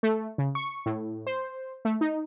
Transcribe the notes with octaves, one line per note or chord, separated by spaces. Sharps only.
A3
C#3
C#6
A2
C5
A3
D#4